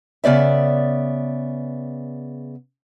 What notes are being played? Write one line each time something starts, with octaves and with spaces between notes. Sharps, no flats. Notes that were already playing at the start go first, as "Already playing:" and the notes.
C#3 B3 D5 E5